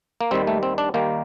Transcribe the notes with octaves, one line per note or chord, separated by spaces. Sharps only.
A#3
D#2 D#3 G3 C4
A3
C4
D4
D#2 D#3 G3 A#3